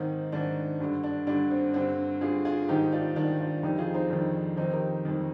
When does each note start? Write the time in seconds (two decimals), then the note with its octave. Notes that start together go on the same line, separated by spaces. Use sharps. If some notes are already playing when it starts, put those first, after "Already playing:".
Already playing: G#2 D#3 C4 D#4
0.32 G#2 D#3 D4
0.80 G2 D3
1.04 D4
1.27 G2 D3 D4
1.51 C4
1.74 G2 D3 C4
2.21 G2 D3 F4 G#4
2.45 F4 G#4
2.68 G#2 D#3 D#4 G4
2.93 D4 F4
3.16 G#2 D#3 D4
3.39 D4 F4
3.63 F2 D#3 D#4 G4
3.78 F4 G#4
3.94 C4 D#4
4.10 F2 D#3 D4
4.57 F2 D#3 C4 D#4
4.73 G4 A#4
5.05 F2 D#3